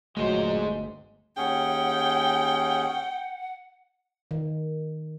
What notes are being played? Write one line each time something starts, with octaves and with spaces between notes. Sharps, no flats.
G1 D2 A#2 F#3 G#3 A3 C5 D#5
D#2 C#4 G#4 F#5 G5
D#3